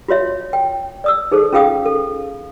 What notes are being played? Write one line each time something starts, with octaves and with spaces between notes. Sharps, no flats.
F4 F#4 C#5 E5
G5
D5 D#6 E6
D#4 G#4 A4 C5
C#4 F4 G#4 F5 G5 D#6
A4